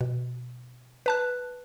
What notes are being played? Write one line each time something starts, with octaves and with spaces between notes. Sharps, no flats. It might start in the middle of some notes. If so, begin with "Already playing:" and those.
B2
B4 A5 F#6